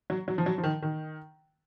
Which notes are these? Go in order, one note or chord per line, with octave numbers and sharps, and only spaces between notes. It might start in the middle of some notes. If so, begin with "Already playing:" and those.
F#3
F#3
F3
F#3
F3
D#3
D#3